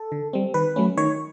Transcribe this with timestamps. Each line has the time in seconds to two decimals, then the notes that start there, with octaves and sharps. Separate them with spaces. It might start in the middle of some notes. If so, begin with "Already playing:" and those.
Already playing: A4
0.12 D3
0.33 G3 C4
0.54 D#3 B4
0.76 F#3 A3 C#4
0.97 D#3 C#5